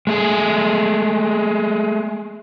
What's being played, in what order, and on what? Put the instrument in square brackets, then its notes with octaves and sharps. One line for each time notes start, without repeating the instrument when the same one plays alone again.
[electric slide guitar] G#3 A3 G#4